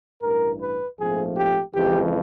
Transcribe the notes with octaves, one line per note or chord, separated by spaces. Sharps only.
A1 G2 E3 A#4
B4
A#1 G#2 F3 A3 C4 G#4
G4
F2 C#3 E3 G#3 G4